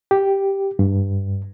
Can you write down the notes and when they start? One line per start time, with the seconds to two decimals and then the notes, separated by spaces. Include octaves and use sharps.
0.11 G4
0.79 G2